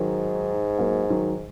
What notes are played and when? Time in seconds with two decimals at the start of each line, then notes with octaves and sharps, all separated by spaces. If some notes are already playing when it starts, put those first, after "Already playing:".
Already playing: G#2 D#3 F#3
0.79 F#3 A#3
1.10 D#3 F#3